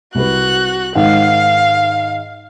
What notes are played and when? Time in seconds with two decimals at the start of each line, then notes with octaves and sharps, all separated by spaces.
0.15 C2 F#4 B4 F#6
0.95 G#2 D#3 F5 F#5